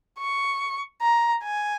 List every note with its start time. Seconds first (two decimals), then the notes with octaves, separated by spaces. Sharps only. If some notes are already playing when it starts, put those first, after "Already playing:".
0.18 C#6
1.01 A#5
1.43 G#5